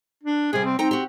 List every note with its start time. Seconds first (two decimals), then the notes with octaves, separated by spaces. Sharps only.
0.23 D4
0.53 C3 G3 G#4
0.64 C4
0.79 C4 D#4 G5 A#5
0.91 F#4 G4